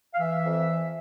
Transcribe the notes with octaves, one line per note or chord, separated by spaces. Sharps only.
F5
E3 E5
F2